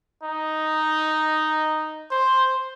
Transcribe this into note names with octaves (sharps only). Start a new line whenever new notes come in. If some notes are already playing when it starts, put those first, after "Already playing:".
D#4
C5